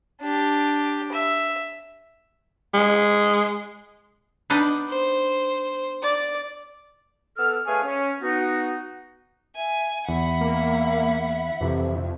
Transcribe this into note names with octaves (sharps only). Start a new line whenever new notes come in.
D4 G4
E5
G#3
B3 D4 D#4
C5
D5
B3 A4 E6 F6
A3 G#4 B4 C#5 F5 G#5
C#4
B3 D#4 F#4
E5 G#5
E2 E5 F#5 B5
A#3
F2 C3 E3